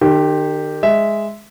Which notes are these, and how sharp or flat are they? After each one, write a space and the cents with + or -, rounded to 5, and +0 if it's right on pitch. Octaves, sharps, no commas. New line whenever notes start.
D#3 -40 G4 +0 G5 +0
G#3 +0 E5 -5